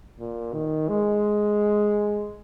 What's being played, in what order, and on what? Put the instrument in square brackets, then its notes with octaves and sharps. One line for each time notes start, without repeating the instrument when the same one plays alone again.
[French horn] A#2
D#3
G#3